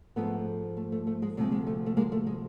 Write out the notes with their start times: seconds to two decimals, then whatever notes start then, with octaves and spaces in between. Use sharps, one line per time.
0.16 G#2 F3 G#3 A3 B3
0.77 A3
0.92 A3
1.07 A3
1.22 G#3
1.37 D2 C3 F3 G#3 A3
1.52 G#3
1.67 A3
1.86 A3
1.97 G#3 A#3
2.12 A3
2.27 G#3